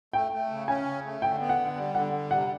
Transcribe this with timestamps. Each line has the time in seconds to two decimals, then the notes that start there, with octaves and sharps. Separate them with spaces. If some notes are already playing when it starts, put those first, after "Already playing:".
0.13 A3 G5
0.32 A3
0.50 C#3
0.68 C#4 G#5
0.85 C#3
1.05 A3
1.22 D3 G5
1.40 B3
1.49 F#5
1.59 D3
1.76 G3
1.95 D3 F#5
2.13 G3
2.31 C3 F#5